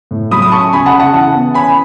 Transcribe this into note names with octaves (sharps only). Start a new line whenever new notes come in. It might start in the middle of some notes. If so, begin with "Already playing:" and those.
A2
F#3 B5 D#6
D#6
C#4 A5 C#6
C#3 G#5 B5
F#5 A5
C#3
F#5 A5
E3 F#5 A5
B3
C#4 G#5 B5